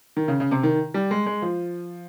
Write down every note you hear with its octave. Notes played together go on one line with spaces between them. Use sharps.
D#3
C#3
C#3
C3
D#3
G3
G#3
G#3
F3